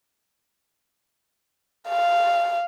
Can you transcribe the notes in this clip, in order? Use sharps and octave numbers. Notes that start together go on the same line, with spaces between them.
F5